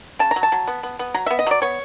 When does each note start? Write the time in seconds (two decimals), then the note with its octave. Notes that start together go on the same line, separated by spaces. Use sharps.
0.19 C#3 A5
0.31 A#5
0.36 F#3
0.43 A5
0.52 F#3
0.68 B3
0.83 B3
0.99 B3
1.14 F#3 A#5
1.26 B3 E5
1.39 D#5
1.47 F#3 D5
1.62 B3 C#5